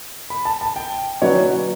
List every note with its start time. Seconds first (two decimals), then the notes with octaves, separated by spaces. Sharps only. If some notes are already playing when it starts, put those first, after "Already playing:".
0.30 B5
0.45 A5
0.61 A5
0.76 G5
1.22 F#3 C#4 F#4 B4 C#5 D5